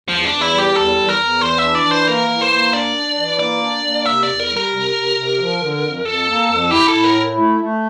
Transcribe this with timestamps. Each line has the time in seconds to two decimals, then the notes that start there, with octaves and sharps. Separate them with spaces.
0.09 E2 F3
0.25 D4
0.30 E2
0.41 E4
0.52 G3
0.58 G4
0.75 E2 A4
0.97 E2
1.09 A#4
1.20 E2
1.41 E3 C5
1.58 D4 E5
1.75 D5
1.85 E3
1.91 C5
2.08 A#3 A#4
2.29 E3
2.41 C5
2.52 A#3
2.73 D4 D5
2.96 D4
3.18 E3
3.39 A#3 D5
3.61 D4
3.84 A#3
4.06 C3 E5
4.23 E2 D5
4.40 A#4
4.51 G3
4.57 A#4
4.72 C3
4.95 C3
5.16 C3
5.39 F3
5.61 D3
5.83 F2
6.05 F2 A4
6.27 A#3
6.49 F2
6.71 E4 G4
6.88 A2 A4
7.04 A#4
7.16 E4
7.37 A3
7.60 A3